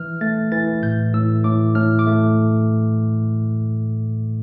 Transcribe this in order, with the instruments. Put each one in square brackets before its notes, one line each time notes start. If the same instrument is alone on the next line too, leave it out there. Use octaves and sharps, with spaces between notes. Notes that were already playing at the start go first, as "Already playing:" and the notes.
Already playing: [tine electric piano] E3 F6
A3 A6
E3 A6
A2 G6
A2 E6
A2 D6
A2 F6
D6
A3